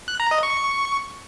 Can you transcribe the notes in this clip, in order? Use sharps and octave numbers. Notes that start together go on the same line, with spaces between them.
F#6
A#5
D#5
C#6